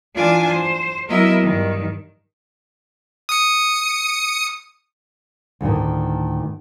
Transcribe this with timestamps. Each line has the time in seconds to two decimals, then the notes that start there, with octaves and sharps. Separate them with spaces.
0.14 E3 D4 F4 D5 G#5 A5
0.47 C5
1.08 F#3 B3 E4 A#4 D#5 E5
1.42 G2 D#3
3.29 D#6 C#7
5.61 D2 A2 D#3